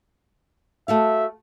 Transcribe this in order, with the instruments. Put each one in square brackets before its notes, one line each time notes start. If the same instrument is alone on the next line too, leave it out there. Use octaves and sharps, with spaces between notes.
[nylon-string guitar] A3 F#4 F5 [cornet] E5